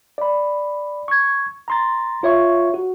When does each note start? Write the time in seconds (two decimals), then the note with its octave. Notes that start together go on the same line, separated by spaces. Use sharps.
0.18 D5 B5
1.08 C#6 G#6
1.68 A#5 C6 A6
2.23 F4 C#5 E5 C#6
2.74 F#4